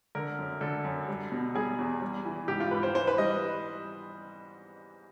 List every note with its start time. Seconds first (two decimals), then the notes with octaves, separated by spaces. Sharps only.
0.15 D3 A#4
0.38 F#2
0.61 D3 A4
0.84 F#2
1.08 G3
1.32 B2
1.54 G3 G#4
1.78 E2
2.01 G3
2.25 E3
2.48 G#2 G4
2.60 F4
2.71 G#2 B4
2.83 C5
2.95 E3 C5
3.07 B4
3.18 G3 D#5